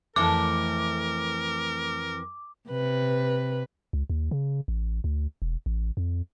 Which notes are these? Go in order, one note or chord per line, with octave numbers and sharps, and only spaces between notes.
F2 E3 A3 A4 A#4 D6
C3 B4
C#2
D#2
C#3
A1
D2
E1
A1
F2